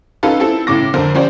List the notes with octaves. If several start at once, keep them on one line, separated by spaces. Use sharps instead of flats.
C#4 D#4 F4 A4 B4
C4 E4 A4 A5
A2 C#3 D6 A#6
F2 D3 A#4 C5
F3 C#4 G4 C5 D5